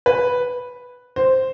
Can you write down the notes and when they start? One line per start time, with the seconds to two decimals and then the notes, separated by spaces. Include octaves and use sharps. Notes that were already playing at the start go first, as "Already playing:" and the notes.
0.06 B4
1.16 C5